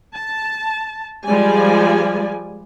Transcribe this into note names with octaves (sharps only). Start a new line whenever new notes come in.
A5
F3 G3 G#3 D5 G#5